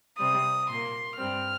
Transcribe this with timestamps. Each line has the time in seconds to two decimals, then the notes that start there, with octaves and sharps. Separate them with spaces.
0.18 C3 G3 C4 D#6
0.69 A#2 A#3 C6
1.17 G2 G3 C4 F6